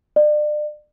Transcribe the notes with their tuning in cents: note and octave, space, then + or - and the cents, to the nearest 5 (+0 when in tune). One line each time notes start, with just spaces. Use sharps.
D5 +35